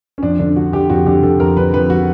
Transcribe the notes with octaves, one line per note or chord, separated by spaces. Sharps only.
C#4
F2 D4
D3 D4
D3 F#4
D3 G4
F2 F#4
D3 G4
D3 A4
F2 A#4
D3 B4
F2 B4
F#4